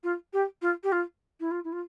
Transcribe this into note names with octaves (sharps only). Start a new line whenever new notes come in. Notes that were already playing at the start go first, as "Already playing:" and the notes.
F4
G4
F4
G4
F4
E4
F4
E4
F4